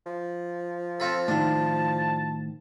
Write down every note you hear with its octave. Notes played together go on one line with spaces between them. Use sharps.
F3
C4 F4 A4 B5
A2 D#3 D4 A5